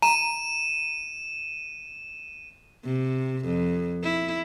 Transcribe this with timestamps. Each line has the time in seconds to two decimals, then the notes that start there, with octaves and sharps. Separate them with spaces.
0.02 A#5 D#7 E7
2.84 C3
3.45 F2
4.03 E4